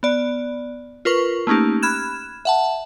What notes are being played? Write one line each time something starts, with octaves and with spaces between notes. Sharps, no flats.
B3 D5
F4 A#4 B4 C#6
A3 A#3 C#4 D#4 G4
B5 F6 F#6 G#6 E7
E5 F#5 A5